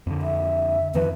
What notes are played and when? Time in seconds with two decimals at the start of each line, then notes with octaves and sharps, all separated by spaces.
0.07 F2 D3
0.22 E5
0.95 F2 D#3 F3 B4